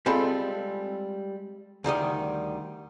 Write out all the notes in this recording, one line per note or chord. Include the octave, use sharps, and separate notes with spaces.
G3 G#3 C4 F4 A4 B5
D2 D#3 G3 D#5